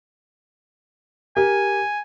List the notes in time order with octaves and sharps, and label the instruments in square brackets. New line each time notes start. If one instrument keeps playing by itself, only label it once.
[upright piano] G4 A#4 [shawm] G#5